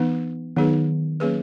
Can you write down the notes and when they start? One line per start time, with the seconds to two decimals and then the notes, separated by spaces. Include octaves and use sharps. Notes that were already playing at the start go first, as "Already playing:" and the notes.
Already playing: E3 B3 D#4
0.56 D#3 F#3 B3 D#4 G#4 B4
1.20 F#3 A#3 C#4 G#4 B4